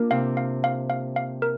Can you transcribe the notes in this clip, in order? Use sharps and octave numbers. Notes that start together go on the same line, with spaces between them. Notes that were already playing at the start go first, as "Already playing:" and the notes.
Already playing: A#3 D4 F4 A#4
C3 C4 F5
F5
F5
F5
F5
A#4